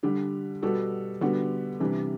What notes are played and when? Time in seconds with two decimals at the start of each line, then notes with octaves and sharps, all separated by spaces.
0.03 D3 G3 D4
0.62 B2 G3 B3 F#4 A4
1.21 D3 G3 B3 F#4
1.80 C3 E3 G3 D4